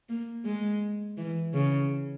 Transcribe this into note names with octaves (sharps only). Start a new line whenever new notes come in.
A#3
G#3
E3
C#3